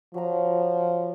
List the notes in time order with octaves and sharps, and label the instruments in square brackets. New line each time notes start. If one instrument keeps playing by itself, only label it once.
[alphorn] F3 [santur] F#3 A#5